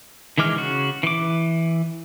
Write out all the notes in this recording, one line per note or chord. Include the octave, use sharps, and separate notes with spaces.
D#3 E3 G#3 D6 F6
C#3 F#4
E3 D6